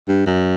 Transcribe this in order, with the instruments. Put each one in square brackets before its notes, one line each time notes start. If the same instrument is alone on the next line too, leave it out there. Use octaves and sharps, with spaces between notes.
[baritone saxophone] G2
F#2